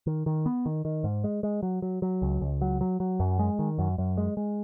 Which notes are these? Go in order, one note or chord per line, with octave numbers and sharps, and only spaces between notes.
D#3
D#3
B3
D#3
D#3
G#2
G#3
G#3
F#3
F#3
F#3
C#2
C#2
F#3
F#3
F#3
F#2
G#3
D#3
F#2
F#2
G#3
G#3